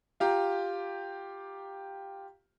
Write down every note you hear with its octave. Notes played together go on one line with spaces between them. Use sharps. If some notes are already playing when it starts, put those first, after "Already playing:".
F4 G4 A#5